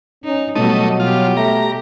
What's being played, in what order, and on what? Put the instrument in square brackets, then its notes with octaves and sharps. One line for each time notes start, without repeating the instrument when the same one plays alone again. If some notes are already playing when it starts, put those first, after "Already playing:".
[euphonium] C#4 [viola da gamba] D#4
[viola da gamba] B2 G3 [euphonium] F#3 [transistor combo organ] A3 D#5
[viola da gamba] B2 G4 [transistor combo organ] F4
[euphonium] A3 [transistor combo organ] A#5